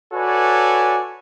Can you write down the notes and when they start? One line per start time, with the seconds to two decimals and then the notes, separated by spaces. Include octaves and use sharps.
0.14 F#4 A4 B4 C#5 D5 G#5